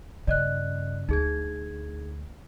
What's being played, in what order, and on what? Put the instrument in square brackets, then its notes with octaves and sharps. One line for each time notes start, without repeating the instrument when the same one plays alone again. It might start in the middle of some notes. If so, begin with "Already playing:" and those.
[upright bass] G2 C#3 [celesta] D5 D#5 F#6
[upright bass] D2 [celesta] D#4 G#4 G#6